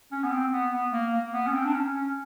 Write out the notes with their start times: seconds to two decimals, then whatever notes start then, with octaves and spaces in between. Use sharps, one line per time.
0.12 C#4
0.24 B3
0.32 C4
0.52 B3
0.73 B3
0.92 A#3
1.13 A#3
1.33 B3
1.47 C#4
1.53 C4
1.64 D4
1.73 C#4
1.94 C#4